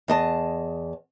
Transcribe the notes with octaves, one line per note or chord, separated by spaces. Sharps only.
E2 D#5 A5